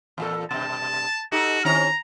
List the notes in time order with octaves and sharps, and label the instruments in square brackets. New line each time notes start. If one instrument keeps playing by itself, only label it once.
[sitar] E2 A#2 A4
[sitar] G2 B2 [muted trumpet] A5
[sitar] D#4 G4 A4 [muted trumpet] F#4
[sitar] D#3 C4 C#4 [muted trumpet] A#5